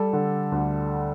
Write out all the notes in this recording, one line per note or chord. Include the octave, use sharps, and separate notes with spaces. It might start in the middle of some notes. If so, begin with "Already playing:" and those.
Already playing: G3 A4
D3
D2